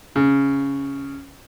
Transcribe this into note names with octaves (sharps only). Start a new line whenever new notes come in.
C#3